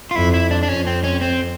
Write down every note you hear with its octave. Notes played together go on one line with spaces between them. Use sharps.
F4
F2 E4
E4
D4
D4
F2 C#4
C4
C#4
C4